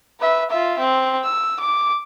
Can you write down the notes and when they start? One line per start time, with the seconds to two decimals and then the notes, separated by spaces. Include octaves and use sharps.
0.20 B4 E5
0.51 F4 E5
0.80 C4
1.24 E6
1.60 D6